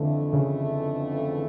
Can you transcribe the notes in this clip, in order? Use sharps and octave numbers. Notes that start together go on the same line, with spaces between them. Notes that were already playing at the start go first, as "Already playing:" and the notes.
Already playing: F2 D3 E3 A3
C#3